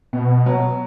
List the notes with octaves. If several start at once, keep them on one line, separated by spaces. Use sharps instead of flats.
B2 B3
F#3